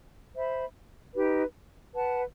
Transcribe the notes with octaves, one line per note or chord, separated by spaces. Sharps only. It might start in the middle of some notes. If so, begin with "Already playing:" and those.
C5 E5 B5
D#4 G4 B4
B4 F#5 A5